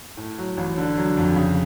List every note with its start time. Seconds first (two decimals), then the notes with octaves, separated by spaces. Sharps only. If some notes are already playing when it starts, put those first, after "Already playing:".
0.17 A2
0.38 F#3
0.57 A1
0.78 D3
0.97 F#3
1.17 F2
1.36 C#3